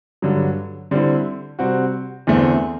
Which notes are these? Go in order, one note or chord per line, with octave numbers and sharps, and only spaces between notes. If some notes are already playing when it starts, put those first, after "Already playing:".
G2 D3 F#3
D3 G3 C4 E4
C3 G3 C4 F#4
E2 D3 A3 C4